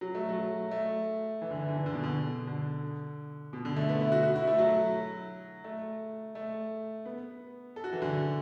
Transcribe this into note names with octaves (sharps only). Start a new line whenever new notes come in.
F#3
A3
F#3
A3
E3
D3
E3
D3
E3
D3
B2
D3
B2
D3
B2
D3
A3
B3
E4
F#4
F#4
E4
A3
F#3
A3
A3
B3
A4
F#4
E3
D3